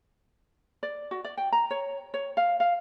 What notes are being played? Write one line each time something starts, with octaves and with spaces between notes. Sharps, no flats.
D5
F#4
D5
G5
A#5
C#5
C#5
F5
F5